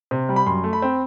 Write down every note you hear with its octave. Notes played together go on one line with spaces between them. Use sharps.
C3
G3
B5
F#2 C6
A3
B5
C4